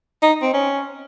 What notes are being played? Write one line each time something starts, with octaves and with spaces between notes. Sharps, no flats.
D#4
C4
C#4